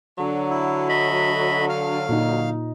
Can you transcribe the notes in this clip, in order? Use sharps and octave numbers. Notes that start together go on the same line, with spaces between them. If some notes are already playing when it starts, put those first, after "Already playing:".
D3 F#3
E4
D#5 E5 B5
F5 F6
A#2 D#4